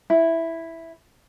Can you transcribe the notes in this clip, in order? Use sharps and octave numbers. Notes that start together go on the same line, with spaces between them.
E4